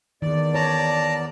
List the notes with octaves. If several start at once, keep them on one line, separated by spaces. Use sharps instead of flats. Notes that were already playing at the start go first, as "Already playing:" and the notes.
E2 D#3 D5
C#5 A5 A#5